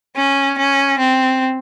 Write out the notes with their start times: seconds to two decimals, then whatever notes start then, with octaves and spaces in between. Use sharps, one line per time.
0.16 C#4
0.58 C#4
0.99 C4